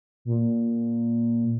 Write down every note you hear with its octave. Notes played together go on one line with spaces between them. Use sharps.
A#2